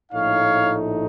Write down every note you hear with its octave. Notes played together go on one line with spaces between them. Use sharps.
A#1 A2 A3 D#4 C#5 F5